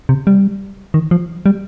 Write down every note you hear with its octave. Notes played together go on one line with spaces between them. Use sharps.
C3
G3
D#3
F3
G3